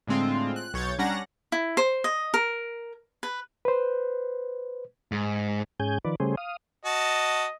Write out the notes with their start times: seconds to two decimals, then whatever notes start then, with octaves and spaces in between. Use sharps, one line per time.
0.07 A2 D3 G#3 C4 F4
0.56 F#6
0.73 B1 C#5 G6 A6
0.99 G3 C#4 D4 F#5 A#5 A#6
1.52 E4
1.77 C5
2.04 D#5
2.34 A#4
3.23 B4
3.65 B4 C5
5.12 G#2
5.80 G#2 C#4 G#4 G#5 G6
6.05 D#3 F3 B4 D5
6.20 C#3 G3 A3 C#4 G#4 C5
6.37 F5 D#6
6.85 F#4 D#5 A5